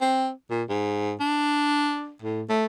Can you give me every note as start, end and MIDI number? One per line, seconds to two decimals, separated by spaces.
0.01 0.31 60
0.50 0.63 46
0.69 1.13 44
1.20 2.13 62
2.22 2.43 45
2.49 2.66 57